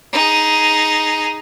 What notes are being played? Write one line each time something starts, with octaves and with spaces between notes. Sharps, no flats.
D#4 G#4